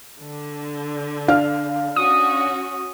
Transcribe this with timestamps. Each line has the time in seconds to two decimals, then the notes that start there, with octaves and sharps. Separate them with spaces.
0.20 D3
1.28 D4 F5 F6
1.96 C#4 F#4 D#6